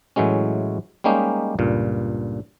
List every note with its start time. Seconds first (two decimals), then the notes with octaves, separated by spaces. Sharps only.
0.16 A2 E3 F#3 G#3 C#4
1.04 G3 G#3 A#3 C#4 D#4 G4
1.59 C#2 G2 A#2